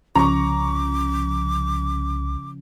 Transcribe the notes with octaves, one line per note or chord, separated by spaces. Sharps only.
C2 C#3 F3 C#4 A#5 C#6 D6